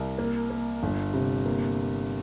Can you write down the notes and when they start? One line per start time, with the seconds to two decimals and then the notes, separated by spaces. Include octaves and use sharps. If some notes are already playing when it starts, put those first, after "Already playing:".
Already playing: C2
0.18 A#3
0.50 A#3
0.83 G1
1.14 C3
1.46 A#3